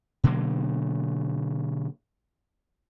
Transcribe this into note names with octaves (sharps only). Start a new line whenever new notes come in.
B2 D3 F#3 A#3